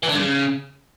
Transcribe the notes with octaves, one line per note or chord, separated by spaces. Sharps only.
E3
D3
G2
C#3